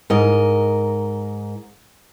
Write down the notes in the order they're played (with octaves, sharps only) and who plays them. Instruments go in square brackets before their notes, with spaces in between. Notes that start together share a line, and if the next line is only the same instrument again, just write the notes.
[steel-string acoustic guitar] G#2 A#4 D#5